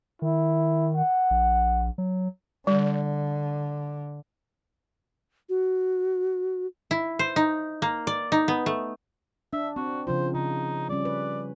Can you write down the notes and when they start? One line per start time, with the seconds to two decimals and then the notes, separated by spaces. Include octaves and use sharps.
0.22 D#3 E4
0.96 F#5
1.31 A#1
1.98 F#3
2.67 D3 G3
5.49 F#4
6.91 E4
7.19 C5
7.36 D#4
7.82 A#3
8.07 D5
8.32 D#4
8.48 B3
8.66 A3
9.53 D4 E5
9.76 C4 F#4
10.07 C#3 F3 F4 C5
10.35 C#3 D#4
10.89 G3 C#4 D5
11.05 B4